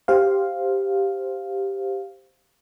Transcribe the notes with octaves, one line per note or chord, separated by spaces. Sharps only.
G4 C5 F5